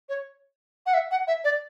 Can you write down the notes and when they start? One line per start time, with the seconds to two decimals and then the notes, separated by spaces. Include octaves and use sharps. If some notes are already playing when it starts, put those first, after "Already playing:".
0.09 C#5
0.86 F#5
0.94 E5
1.11 F#5
1.27 E5
1.44 D5